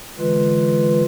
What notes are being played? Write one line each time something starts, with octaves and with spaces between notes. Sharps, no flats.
D3 E3 G#3 F4 B4